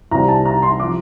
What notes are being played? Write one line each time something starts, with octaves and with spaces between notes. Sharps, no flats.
C2 C3 G3 A#5
A5
A#5
C6
F3 D6